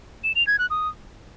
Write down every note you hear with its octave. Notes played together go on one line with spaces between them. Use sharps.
E7
F7
G#6
F#6
D#6